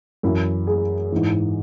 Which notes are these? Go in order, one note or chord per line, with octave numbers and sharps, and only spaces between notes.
F#2 E3 E4
G#4
G#2 E3